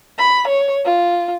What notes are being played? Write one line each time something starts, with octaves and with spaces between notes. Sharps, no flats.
B5
C#5
F4